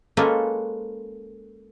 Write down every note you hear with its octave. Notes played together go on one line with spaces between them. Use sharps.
G#3 A#3 C#4 F4 A4 B4